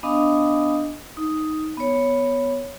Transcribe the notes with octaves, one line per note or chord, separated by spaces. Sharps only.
B3 D4 D#5 F5 G#5 D#6
D#4
B3 C#5